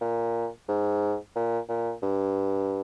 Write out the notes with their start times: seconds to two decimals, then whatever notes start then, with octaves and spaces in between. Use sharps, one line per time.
0.01 A#2
0.68 G#2
1.35 A#2
1.69 A#2
2.02 G2